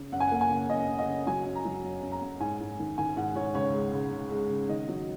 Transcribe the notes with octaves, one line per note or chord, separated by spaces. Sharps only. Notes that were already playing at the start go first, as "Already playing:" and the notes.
Already playing: C#3
F#2 F#5
G#5
A#3 F#5
G#5
C#3
F#2 D#5
F#2
D#5
C#3
F#3 G#5
F#2
A#5
F#3
F#2
F#2
A#5
F#2
G#2 G#5
G#2
D#3
D#3 G#5
G#2 F#5
G#2 C#5
C#2 C#5
G#3
C#2
C#3
G#3
C#3
D#3 D#5
F#3